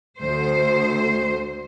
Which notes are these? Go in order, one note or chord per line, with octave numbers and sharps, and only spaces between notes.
D2 C5